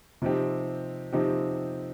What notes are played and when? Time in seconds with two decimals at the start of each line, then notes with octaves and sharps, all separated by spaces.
0.22 C3 F3 C4 D#4 G4
1.13 C3 F3 C4 D#4 G4